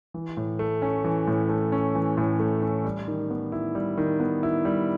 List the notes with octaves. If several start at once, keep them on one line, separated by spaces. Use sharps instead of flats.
E3
A2
A3
C#4
E3
A2
A3
C#4
E3
A2
A3
C#4
G3
D#3
B3
E4
G3
D#3
B3
E4
G3